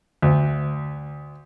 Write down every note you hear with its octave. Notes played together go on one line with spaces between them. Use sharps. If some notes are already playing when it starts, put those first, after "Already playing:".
D2